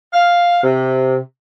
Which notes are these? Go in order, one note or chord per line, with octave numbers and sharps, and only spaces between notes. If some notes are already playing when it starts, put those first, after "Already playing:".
F5
C3